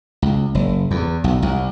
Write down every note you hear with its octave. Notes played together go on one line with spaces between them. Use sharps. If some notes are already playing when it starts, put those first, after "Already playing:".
C#2
F#1
E2
B1
C2